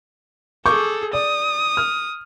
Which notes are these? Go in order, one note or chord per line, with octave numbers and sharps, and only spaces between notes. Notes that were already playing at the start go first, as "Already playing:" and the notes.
G#4 A4 C#6 D6 G6
D5 D#6
F6